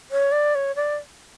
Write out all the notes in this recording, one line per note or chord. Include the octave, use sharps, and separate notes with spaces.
C#5
D5
C#5
D5